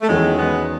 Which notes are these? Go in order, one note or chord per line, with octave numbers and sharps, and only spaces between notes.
A3
E2 D#3 E3 F#3 G#3 C#4 G#4
G#3 B3